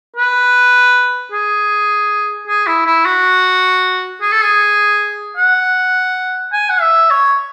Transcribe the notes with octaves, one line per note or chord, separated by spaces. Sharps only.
B4
G#4
G#4
E4
E4
F#4
G#4
A4
G#4
F#5
G#5
F#5
E5
C#5